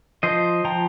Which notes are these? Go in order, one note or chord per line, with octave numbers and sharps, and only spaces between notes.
F3 C5 D#5
F3 G5 A#5